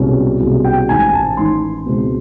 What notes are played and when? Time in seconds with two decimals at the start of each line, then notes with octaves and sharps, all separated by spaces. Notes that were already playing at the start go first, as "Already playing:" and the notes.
Already playing: C2 B2 G#3 C#4
0.41 C2 B2 G#3 C#4
0.65 G5
0.88 A1 G#2 D#3 G#5
1.14 A5
1.37 A1 G#2 D#3 C6
1.86 C#2 B2 G#3 C4